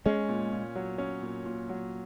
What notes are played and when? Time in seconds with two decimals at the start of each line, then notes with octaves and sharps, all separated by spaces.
0.05 G#3 C#4
0.28 A#2
0.52 A#2
0.75 F#3
0.98 C#4
1.22 A#2
1.45 A#2
1.69 F#3